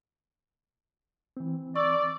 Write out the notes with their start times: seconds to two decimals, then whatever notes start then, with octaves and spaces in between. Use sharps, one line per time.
1.37 E3 C4
1.76 D5 C#6 E6